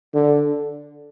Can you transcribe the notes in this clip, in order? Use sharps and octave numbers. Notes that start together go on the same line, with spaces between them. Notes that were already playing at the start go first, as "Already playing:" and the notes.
D3